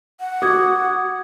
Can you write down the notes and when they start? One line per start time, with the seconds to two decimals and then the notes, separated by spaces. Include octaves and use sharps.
0.20 F#5
0.42 F#4 D6 D#6 G#6